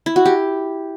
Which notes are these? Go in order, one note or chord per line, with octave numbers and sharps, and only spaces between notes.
E4
F#4
G4